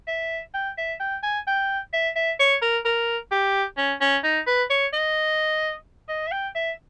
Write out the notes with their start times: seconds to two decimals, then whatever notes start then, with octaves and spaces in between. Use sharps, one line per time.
0.07 E5
0.54 G5
0.78 E5
1.00 G5
1.23 G#5
1.47 G5
1.93 E5
2.16 E5
2.39 C#5
2.62 A#4
2.85 A#4
3.31 G4
3.77 C#4
4.01 C#4
4.24 D#4
4.47 B4
4.70 C#5
4.93 D#5
6.09 D#5
6.27 E5
6.32 G5
6.55 E5